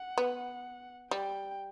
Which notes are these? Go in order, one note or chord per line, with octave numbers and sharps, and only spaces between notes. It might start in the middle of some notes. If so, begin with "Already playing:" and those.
Already playing: F#5
B3
G3 G5